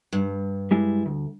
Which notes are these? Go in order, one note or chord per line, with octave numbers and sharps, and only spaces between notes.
G2
G3 G#3 E4
D2